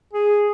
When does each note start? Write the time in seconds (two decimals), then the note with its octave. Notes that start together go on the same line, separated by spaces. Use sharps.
0.14 G#4